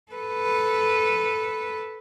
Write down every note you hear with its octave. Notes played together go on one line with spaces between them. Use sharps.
A4 B4